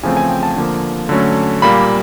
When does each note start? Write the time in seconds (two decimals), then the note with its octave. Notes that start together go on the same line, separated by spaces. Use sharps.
0.03 E2 C#3 F3 A3 C4 G#5
0.17 G#5
0.29 G5
0.43 A5
0.56 D3 F3 A#3
1.09 D3 F#3 A3 C#4
1.62 A#2 G3 A#3 B5